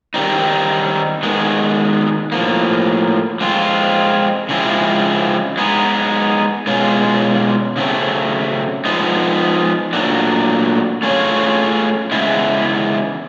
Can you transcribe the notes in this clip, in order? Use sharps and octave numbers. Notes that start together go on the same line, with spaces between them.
D#3 G3 C4 D#4
D#3 G#3 B3
A2 F3 A#3
F3 G#3 C4 F4
C#3 F3 G#3 C4 E4
G#3 B3 D#4
B2 G#3 C#4 F4
C#3 F#3 A3 C4
F3 G#3 B3 D#4
A#2 F#3 A3 D4 F#4
A3 C#4 F4 G#4 C#5
C#3 E3 G#3 B3 E4